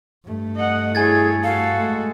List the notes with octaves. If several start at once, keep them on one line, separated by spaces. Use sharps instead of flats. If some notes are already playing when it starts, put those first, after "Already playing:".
G2 A3
D#5 F#5
E4 G#4 C#5 G#5 G#6 A6
F#4 A4 F5
G#3 A3